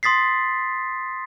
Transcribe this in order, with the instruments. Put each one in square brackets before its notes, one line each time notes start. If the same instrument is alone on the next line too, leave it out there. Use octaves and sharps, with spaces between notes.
[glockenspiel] C6 D#6 A6 B6 C7